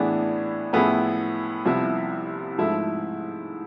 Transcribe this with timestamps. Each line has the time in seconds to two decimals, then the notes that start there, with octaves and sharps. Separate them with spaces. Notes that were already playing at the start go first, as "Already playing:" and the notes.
Already playing: A2 E3 B3 D4 G#4
0.73 A2 F3 B3 E4 G#4
1.65 C2 C3 F3 B3 E4
2.58 G#2 F3 A3 E4